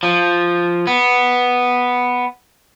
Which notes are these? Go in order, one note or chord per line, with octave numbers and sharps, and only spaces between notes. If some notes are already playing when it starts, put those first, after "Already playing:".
F3
B3